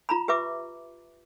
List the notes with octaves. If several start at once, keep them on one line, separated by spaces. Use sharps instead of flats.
F4 A#5 B5
G4 B4 E5 D6